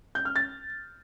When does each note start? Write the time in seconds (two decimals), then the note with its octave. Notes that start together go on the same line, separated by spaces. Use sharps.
0.15 G6
0.25 F6
0.36 A6